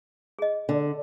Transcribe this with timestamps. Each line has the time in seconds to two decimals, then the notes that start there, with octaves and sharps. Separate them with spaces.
0.39 G#4 D#5
0.69 D3